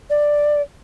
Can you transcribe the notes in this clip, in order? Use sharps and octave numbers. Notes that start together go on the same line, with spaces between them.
D5